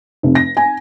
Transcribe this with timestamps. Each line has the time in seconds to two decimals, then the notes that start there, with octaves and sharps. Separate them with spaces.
0.23 F1
0.35 A#6
0.57 G#5